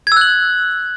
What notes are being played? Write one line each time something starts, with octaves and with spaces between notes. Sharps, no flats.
E6 F#6 G#6 F#7